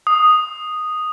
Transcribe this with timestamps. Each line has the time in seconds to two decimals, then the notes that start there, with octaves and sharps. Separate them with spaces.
0.07 D#6